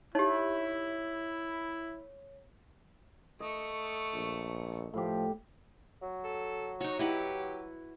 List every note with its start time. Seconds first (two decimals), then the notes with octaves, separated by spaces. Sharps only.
0.15 D#4 E4 G4 C#5
3.40 A3 D#5 C#6
4.14 A#1
4.94 A2 F3 G4
6.02 F#3
6.24 A4
6.81 D#4 F#4 C#5
6.99 E4 G4 B4 F#5